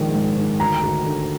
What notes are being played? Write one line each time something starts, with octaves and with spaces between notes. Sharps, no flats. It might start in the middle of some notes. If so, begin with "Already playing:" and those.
Already playing: A#1 D#3 G#3
G#2
D#3
D2 A#5
D2
D3